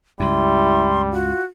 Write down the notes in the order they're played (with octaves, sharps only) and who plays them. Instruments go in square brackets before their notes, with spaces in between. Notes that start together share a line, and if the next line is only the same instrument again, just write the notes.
[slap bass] C#2 G2 [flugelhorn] G3 [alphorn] E4 [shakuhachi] C6
[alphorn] F4 [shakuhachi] F#4